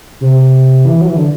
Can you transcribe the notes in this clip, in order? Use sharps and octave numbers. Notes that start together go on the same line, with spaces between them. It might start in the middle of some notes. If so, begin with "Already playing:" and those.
C3
E3
F#3
E3
D3